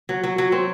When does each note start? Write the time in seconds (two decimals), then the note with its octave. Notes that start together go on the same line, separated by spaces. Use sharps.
0.09 F#3
0.24 F#3
0.38 F#3
0.52 C4